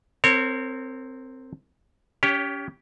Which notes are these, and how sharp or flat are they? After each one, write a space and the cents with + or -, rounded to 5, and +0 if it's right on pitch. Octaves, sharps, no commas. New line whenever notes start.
C4 +0 A#4 -35 C#5 -20
C#4 +30 G4 +0 C#5 +0